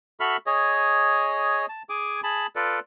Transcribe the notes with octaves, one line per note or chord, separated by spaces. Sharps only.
F#4 A4 E5 B5 F6
G#4 C#5 D#5
A5
G#4 G#5 D6
G#4 A5 B5
F4 A4 B4 D5